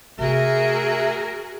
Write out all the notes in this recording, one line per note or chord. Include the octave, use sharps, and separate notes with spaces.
C3 A3 F#4 G#4 A#4 E5